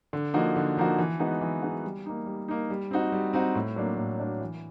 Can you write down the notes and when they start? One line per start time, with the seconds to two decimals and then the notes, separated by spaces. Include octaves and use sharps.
0.13 D3
0.34 F3 A#3 D#4 F#4
0.56 D3
0.77 F3 A#3 D#4 F#4
0.98 E3
1.20 G#3 B3 D#4 F#4
1.41 E3
1.63 G#3 B3 D#4 F#4
1.83 G3
2.06 A#3 D#4
2.26 G3
2.48 A#3 D#4
2.70 G3
2.91 C4 D#4 F#4
3.12 G3
3.33 C4 D#4 F#4
3.55 A2
3.76 F#3 A#3 D4
3.98 A2
4.20 F#3 A#3 D4
4.41 E3